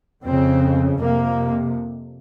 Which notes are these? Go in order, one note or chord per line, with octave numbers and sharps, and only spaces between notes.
F2 C#3 C4
F2 C3 A#3